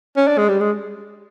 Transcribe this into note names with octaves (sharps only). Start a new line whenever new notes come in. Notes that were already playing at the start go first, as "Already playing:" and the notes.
C#4
D4
G#3
G3
G#3